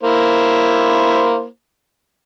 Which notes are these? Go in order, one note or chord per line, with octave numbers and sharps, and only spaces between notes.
A#3 E4 C5